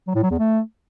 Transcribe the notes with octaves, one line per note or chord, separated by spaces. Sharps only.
F#3
A2
F#3
E2
A3